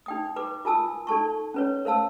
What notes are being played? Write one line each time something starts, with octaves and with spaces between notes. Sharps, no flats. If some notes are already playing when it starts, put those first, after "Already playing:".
D#4 G5 D#6
B4 D6
F4 A#4 G#5 A5 D#6 E6
D#4 A4 A5 C#6
C#4 B4 C#5
A#4 C5 F5 A5 E6